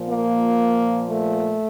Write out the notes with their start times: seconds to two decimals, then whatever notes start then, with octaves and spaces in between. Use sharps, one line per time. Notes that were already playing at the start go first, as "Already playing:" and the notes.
Already playing: A#2 F3
0.10 A#3
1.10 A3